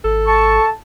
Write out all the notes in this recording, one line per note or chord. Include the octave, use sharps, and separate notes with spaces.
G#1 A4
A5 C#6